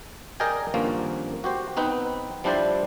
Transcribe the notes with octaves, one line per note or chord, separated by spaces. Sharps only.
G#4 A#4 D5 D#5 G5 G#5
G#1 G2 F3 A#3 C#4 F4
F#4 G4 C5
B3 C4 D#4 B4
F3 G3 D4 E4 C5 D5